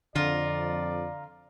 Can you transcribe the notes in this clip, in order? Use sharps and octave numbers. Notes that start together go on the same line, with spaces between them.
F2 D3 F4 A#4 D5